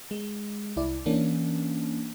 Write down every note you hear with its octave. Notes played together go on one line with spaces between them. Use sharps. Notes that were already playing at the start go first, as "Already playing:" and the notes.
G#3
C2 E4 D5
E3 A#3 C#4 D4